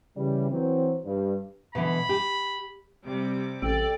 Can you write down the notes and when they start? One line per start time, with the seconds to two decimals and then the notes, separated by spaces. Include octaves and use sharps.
0.16 C#3 E3 G3
0.51 E3 F#3 C4
1.05 G2
1.75 B2 D3 E3 B5
2.09 G4
3.05 C3 G3 D6
3.62 A1 A4 D5 G5